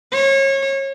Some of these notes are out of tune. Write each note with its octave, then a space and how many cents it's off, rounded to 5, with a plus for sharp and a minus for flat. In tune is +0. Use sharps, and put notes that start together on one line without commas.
C#5 -30